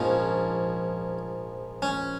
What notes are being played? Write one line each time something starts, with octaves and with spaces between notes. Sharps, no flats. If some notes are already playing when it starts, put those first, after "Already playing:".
Already playing: A#1 G#2 F3 C#4
C#4